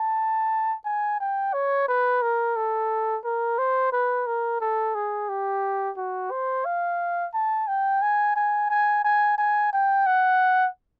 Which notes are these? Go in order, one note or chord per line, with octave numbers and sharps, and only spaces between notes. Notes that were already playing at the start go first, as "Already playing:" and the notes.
Already playing: A5
G#5
G5
C#5
B4
A#4
A4
A#4
C5
B4
A#4
A4
G#4
G4
F#4
C5
F5
A5
G5
G#5
G#5
G#5
G#5
G#5
G5
F#5